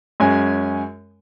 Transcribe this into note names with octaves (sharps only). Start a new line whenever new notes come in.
F#2 G#3 C#4 G#5